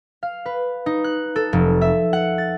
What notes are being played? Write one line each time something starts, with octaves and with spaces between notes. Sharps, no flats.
F5
B4
D#4
F#6
A4
F1
E5
F#5
A6